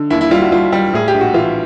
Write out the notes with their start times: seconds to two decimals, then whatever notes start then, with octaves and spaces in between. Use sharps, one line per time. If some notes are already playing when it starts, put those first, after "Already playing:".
Already playing: D3
0.10 D#2 E4
0.21 E4
0.31 G3 F4
0.42 F#4
0.52 G3 F4
0.72 G3
0.93 A2 G#4
1.08 G4
1.14 A#1
1.21 F#4
1.34 E3 F4